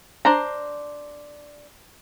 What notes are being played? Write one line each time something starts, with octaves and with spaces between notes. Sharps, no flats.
D4 C5 A#5